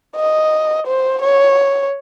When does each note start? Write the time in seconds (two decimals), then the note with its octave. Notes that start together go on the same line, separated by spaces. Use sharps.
0.16 D#5
0.87 C5
1.22 C#5